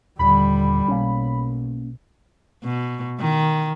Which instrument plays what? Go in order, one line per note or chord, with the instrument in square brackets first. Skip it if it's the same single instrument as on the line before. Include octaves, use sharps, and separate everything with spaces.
[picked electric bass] D#1 [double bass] D3 G3 [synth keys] B5
[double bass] B1 [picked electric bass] A#3 C#4
[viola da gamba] B2
D#3